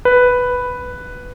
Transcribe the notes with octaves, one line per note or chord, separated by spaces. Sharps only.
B4